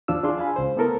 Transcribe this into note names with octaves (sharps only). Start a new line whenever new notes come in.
D#2 F3 D4 F4 E6
D4 E4 F4 G#4 C6
F5 G#5 B5
C#2 C5
A3 B3 E4 A4 A#4